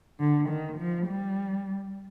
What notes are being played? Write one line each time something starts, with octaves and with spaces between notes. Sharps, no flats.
D3
D#3
F3
G3